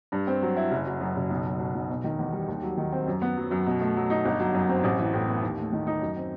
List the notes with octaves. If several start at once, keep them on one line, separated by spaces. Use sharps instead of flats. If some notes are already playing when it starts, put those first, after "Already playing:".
G2
C4
F#3
E4
F#1
F#3
F#2
F#1
B1
F#3
B2
B1
E1
D#3
E2
G3
D#2
F#3
D#3
C4
F#2
B3
F#3
F#2
B2
A3
F#3
D#4
G1
F#3
F#2
C4
A1
E3
A2
B3
D#2
A3
D#3
D#4
F#2
C4